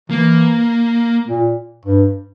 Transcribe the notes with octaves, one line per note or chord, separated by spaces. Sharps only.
E3 A#3
A#2
G2